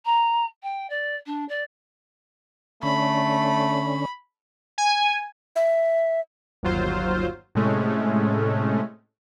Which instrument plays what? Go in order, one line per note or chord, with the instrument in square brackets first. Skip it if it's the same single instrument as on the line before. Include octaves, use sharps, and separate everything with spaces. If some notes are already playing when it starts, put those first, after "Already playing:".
[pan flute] A#5
G5
D5
D4
D5
[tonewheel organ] D3 C#4 [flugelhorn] A3 [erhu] B5
[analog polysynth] G#5
[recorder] E5
[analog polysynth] G1 D#2 F#3 F4 C5
A2 C3 G#3 A3 C#4